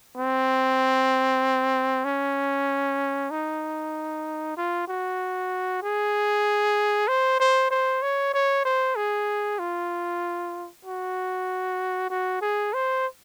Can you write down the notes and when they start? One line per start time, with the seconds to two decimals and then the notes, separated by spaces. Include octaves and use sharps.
0.17 C4
2.05 C#4
3.30 D#4
4.56 F4
4.88 F#4
5.82 G#4
7.08 C5
7.39 C5
7.71 C5
8.02 C#5
8.33 C#5
8.65 C5
8.96 G#4
9.59 F4
10.85 F#4
12.10 F#4
12.41 G#4
12.73 C5